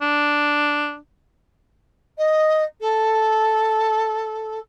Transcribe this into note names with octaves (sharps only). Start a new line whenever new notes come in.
D4
D#5
A4